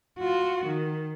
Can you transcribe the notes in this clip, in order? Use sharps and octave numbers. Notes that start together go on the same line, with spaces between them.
F4 F#4
D#3